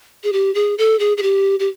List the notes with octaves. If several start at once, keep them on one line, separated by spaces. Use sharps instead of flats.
G#4
G4
G#4
A4
G#4
G#4
G4
G4